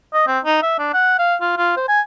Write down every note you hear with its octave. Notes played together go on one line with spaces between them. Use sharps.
D#5
C4
D#4
E5
D4
F#5
F5
F4
F4
C5
G#5